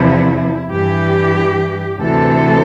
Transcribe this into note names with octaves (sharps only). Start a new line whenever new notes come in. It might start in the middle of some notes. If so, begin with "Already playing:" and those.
Already playing: E2 C3 F3 E4
G2 E3 G4
D2 C3 E3 A4